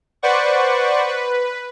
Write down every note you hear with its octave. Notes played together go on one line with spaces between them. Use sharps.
B4 C5 D5 F#5 C#6
B4